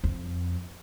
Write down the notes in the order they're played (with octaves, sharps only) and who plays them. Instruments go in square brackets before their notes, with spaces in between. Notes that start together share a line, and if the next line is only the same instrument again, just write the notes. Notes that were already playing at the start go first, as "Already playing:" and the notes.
[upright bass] F2